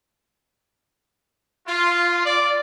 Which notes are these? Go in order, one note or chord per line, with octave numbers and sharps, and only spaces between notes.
F4
D5